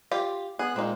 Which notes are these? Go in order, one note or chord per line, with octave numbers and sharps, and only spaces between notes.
F4 G4
B3 G#4 F#6
A#2 G#3 A#3 C4 D#4